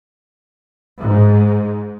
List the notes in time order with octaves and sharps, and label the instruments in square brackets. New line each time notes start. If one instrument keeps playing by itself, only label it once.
[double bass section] G#2